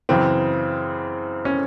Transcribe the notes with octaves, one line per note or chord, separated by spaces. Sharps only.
F#2 C#3 E3 C4
C#4